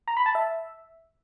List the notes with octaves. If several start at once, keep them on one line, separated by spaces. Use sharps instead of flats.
A#5
B5
A5
E5